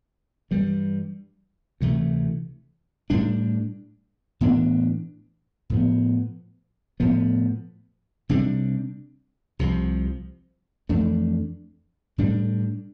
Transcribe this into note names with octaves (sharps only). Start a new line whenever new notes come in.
G2 E3 G3
D2 C3 E3 A3
A2 G3 D4
A2 E3 B3 D4
A2 F3 B3
A2 F3 B3
C3 G3 D4
C2 C3 F3
F2 E3 A3 D4
A2 G3 D4